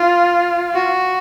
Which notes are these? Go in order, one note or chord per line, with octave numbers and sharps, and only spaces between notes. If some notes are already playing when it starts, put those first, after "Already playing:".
Already playing: F4
F#4